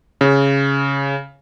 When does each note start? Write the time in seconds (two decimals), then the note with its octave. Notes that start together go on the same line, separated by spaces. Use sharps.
0.21 C#3